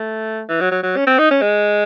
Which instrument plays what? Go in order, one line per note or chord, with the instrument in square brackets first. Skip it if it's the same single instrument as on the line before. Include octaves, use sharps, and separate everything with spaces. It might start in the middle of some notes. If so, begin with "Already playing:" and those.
Already playing: [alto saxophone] A3
E3
F#3
F#3
F#3
C#4
C4
D#4
C#4
G#3